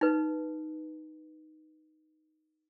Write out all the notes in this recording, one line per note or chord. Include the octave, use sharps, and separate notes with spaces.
D#4 B4